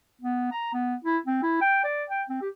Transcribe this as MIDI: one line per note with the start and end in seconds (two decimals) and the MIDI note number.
0.22 0.47 59
0.52 0.70 82
0.74 0.95 59
1.05 1.18 64
1.26 1.39 60
1.43 1.57 64
1.61 1.82 79
1.84 2.05 74
2.10 2.23 79
2.29 2.39 60
2.42 2.49 67